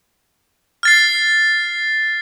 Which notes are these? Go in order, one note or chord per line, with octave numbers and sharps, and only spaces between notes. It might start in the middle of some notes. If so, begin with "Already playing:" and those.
F6 A6 C7